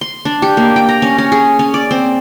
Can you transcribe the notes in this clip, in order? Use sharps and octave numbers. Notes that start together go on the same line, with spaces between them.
C6
D4
G4
A#3
G5
A#5
C#4
C#4
G#4
C#4
D5
C4